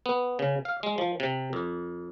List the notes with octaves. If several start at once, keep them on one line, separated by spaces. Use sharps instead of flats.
B3
C#3
F5
G#3
F3
C3
F2